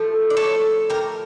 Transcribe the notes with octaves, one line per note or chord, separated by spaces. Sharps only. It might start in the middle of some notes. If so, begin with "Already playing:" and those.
Already playing: A2 F3 A3
D5
A4 C#5
G4 A#4